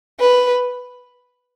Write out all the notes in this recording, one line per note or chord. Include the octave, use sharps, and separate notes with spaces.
B4